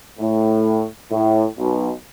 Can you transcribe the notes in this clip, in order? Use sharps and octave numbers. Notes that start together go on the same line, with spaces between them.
A2
A2
B1 B2